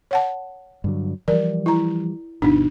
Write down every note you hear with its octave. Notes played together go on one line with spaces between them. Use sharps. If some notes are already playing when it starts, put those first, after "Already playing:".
C#5 F#5 A5
G2 D3 F#3
E3 F3 G3 A#4 D5
E4 A#5
G1 B2 D4 D#4